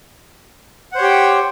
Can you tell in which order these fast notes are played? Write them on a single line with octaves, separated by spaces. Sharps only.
F#5 C5 C#5 G4 G5